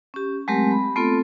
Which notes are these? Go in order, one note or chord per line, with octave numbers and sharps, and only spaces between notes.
C#4 G4
F#3 G#3 A3 C4 G4 A#4
B5
A3 B3 C4 F4 A4